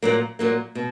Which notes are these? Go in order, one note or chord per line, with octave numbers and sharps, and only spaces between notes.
A#2 F#3 A#3
A#2 F#3 A#3
B2